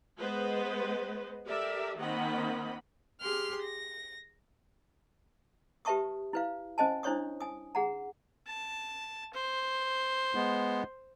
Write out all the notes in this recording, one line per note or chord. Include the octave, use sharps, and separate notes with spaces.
G#3 B3 B4 C5 D#5
G4 A4 A#4 D5 E5
D#3 A#3 C4 D#5 F#5 B5
G4 G#4 C6 F6
A#6
G4 B4 E5 A5 C#6 D#6
E4 B4 F5
C#4 C5 D#5 G#5 A5
D4 E4 C5 C#5 C#6 D#6
G#5 D#6
G#4 F#5 A#5
A5
C5
G#3 B3